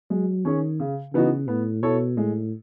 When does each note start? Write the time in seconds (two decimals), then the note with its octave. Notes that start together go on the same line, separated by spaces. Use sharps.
0.10 F#3 G#3
0.45 D#3 C#4 G#4 C#5
0.80 C#3
1.13 C#3 E3 B3 D#4 F#4
1.48 A2 B3
1.82 B2 E4 A4 C#5
2.17 A2 G#3